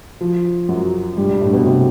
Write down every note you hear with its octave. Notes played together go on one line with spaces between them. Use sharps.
F3
F#2 F#3
G2 G3
G2 G3
A2 A3
B2 B3
C3 C4